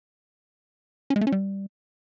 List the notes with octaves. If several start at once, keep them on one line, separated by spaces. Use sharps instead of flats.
C#4
G#3
A3
C#4
G3